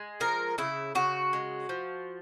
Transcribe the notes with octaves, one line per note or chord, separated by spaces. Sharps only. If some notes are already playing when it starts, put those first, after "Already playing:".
Already playing: G#3
F3 A#4
C#3 E4
C#3 F#4
G#3
F3